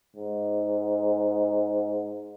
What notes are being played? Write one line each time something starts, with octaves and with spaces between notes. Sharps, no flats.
G#2